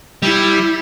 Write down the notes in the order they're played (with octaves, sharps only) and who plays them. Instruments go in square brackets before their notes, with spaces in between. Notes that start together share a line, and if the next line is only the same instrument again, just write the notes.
[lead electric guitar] G3 [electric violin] E4